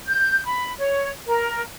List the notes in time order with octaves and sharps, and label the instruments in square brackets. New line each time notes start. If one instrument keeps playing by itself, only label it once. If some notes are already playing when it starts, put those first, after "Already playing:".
[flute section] G6
B5
C#5
A#4